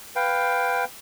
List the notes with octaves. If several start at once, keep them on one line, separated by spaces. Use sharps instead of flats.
B4 F5 G5